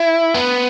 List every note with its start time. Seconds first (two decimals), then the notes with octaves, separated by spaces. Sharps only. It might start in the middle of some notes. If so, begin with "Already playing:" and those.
Already playing: E4
0.34 B3